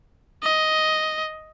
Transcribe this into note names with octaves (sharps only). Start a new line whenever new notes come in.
D#5